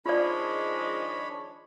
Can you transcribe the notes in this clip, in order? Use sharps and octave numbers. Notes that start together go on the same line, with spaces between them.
D#3 F3 G#3 D4 F4 C#5 D5 B5